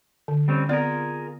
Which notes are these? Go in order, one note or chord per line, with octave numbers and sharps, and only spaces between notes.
D3
G3 C4 C#4
B3 C4 F4 G#4 A#4 D5